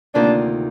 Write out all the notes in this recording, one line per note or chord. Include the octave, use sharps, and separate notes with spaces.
D2 C3 D#3 A#3 D4 F4